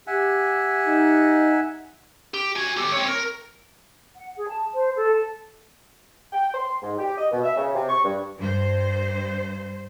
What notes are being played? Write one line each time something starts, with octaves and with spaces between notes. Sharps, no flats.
G4 E5 F#5 G#5
D#4
G4
F#4 G#5
G4 A4
C4 C#5
A#4
F#5
G#4
A5
C5
A4
G5
C6
G#2
G4
D#5
B2
E5
C#3
C3
C#6
G2
G2 C5